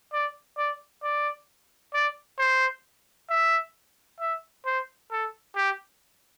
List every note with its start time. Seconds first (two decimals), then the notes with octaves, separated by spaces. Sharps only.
0.13 D5
0.58 D5
1.03 D5
1.94 D5
2.39 C5
3.30 E5
4.20 E5
4.66 C5
5.12 A4
5.56 G4